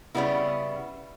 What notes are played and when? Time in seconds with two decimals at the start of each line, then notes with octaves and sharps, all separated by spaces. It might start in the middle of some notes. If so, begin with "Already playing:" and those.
0.15 C#3 G3 B3 E4